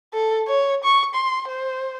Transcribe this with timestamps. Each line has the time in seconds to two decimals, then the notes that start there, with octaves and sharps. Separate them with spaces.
0.14 A4
0.48 C#5
0.84 C#6
1.14 C6
1.48 C5